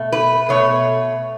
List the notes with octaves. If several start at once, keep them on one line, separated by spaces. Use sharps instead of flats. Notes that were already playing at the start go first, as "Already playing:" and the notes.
Already playing: B2 A3
B4
B2 A3 C#5